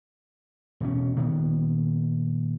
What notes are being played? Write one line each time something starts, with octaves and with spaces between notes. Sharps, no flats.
E1 B2 C#4
A#2 D#3 B3